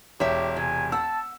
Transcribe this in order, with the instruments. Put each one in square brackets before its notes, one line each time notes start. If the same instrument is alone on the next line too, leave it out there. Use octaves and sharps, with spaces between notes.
[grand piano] E1 [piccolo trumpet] G4 [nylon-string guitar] C#5 E5
[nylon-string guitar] C3 [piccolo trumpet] G#5
[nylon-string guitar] F#5 [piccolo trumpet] A5 [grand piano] E6